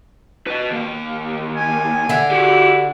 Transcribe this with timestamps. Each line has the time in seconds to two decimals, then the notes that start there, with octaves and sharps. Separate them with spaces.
0.47 B4 D#5
0.71 D#2 A#3
1.56 G#5
2.09 D3 E5
2.31 E4 F#4 G4